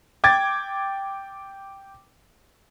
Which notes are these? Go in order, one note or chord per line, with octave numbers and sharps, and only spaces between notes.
G5 D6 G#6 A6